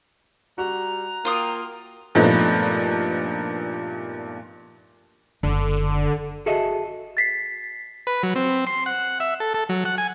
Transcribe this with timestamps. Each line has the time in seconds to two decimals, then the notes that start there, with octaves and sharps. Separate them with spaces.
0.58 G3 F#4 A#5
1.25 A#3 F4 G5 D#6
2.15 G2 A#2 F3 A3 B3 D#4
5.43 F#1 D3
6.46 F#4 G#4 A4 D#5 E5
7.17 A6 B6 C7
8.07 B4
8.23 F#3
8.36 C4
8.67 C6
8.86 F#5
9.20 E5
9.40 A4
9.54 A4
9.69 F#3
9.85 F#5
9.98 G#5